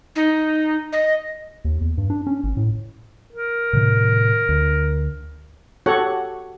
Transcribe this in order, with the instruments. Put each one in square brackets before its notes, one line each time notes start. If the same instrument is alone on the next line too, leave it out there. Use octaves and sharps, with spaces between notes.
[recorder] D#4
D#5
[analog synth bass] D#2
E2
G2
D4
C#4
G#1
A2
[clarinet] A#4
[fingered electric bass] A2 C3 D#3
D2
[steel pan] F#4 G4 A4 C#5 F#5